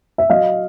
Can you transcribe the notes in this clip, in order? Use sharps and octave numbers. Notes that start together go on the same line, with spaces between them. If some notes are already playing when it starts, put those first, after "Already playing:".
E5
F#3 D#5 F5